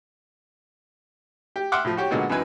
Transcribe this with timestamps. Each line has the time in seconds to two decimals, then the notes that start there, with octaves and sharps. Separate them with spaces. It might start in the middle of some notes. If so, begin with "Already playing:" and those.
1.56 G4
1.72 E5 F#5 C6 D6 F6
1.85 A2 F3
1.97 F#4 G4 C#5
2.11 A#2 D3 G#3 B3 F#4
2.29 F#2 E3 D#4 B4 G#5